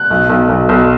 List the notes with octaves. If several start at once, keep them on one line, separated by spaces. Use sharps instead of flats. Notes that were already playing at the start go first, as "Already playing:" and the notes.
Already playing: F#6
B1
B1
B1
B1